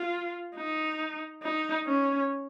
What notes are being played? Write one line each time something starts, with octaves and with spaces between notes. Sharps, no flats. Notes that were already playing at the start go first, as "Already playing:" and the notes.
Already playing: F4
D#4
D#4
C#4